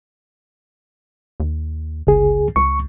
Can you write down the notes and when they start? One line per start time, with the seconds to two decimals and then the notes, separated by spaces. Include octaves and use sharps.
1.40 D#2
2.07 G1 C#2 G#4
2.56 C#2 C#6